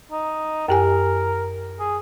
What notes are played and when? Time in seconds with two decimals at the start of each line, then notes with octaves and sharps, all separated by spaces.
0.12 D#4
0.69 F#2 G4 A#4 G#5
1.79 G#4